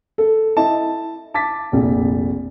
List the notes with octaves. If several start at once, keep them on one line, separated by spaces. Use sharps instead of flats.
A4
E4 D#5 A5
A5 D6 A6 B6
F1 A#1